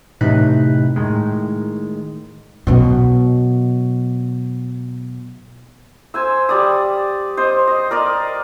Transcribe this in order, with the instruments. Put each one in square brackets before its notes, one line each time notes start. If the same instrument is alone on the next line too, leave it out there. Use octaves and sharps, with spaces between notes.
[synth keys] A2 C3 E3 D#4 B5 F#6
A2 D#3 G#3
[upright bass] B2 F#3
[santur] C5 G#5 E6
G3 D5 D#6
C5 D#5
D#5
A#4 D5 D#5